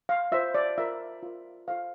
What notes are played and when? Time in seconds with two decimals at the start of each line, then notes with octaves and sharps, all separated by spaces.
0.09 F5
0.32 F4 C5 E5
0.55 D5
0.78 F4 A#4 E5
1.23 F4 A#4
1.68 F4 A4 C5 F5